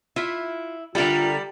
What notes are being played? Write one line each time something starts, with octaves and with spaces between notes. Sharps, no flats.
E4 F4 E5
D3 G3 F4 A4 A#4 E5 G5